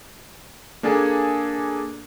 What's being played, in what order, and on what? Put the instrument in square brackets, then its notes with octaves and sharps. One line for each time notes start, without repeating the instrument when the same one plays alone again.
[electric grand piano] A#3 D4 G#4 A4 G#5